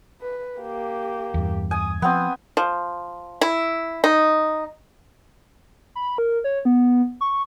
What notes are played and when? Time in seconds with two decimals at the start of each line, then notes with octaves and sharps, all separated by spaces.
0.21 B4
0.60 A#3 G4
1.34 E2 G2
1.71 G#5 D#6
2.02 F3 B3 C4 D#6
2.57 F3
3.41 E4
4.04 D#4
5.95 B5
6.18 A#4
6.44 C#5
6.65 B3
7.21 C#6